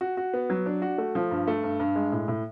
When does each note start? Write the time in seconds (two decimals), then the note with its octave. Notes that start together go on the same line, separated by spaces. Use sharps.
0.01 F#4
0.17 F#4
0.33 B3
0.50 F#3
0.66 D4
0.82 F#4
0.98 A3
1.15 F3
1.31 G2
1.47 A3
1.64 G2
1.80 G2
1.95 G#3
2.12 A2
2.28 A2